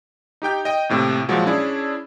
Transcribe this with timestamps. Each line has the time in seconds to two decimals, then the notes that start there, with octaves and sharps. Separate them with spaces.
0.42 D#4 G4 G5 G6
0.65 D#5 G5
0.89 D#2 A2 C3
1.29 A#2 F3 F#3 G#3 F#4
1.46 C#4 D4 E4 G#4